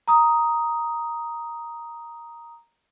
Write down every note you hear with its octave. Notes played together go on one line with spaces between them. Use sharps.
A#5 D#6